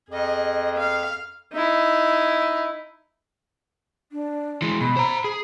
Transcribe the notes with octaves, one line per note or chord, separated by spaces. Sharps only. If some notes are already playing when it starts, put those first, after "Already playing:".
F2 G#4 D#5
F5
D#4 E4
D4
E3 G#3
B2 B5
C5 A#5
G#4